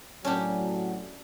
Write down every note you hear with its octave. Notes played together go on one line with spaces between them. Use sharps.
A2 F#3 C#4 D4 G4